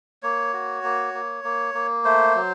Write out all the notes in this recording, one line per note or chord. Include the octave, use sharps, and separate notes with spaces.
A#3 C#5
F#4
A#3
A#3
A#3
A#3
A3 C5
F#3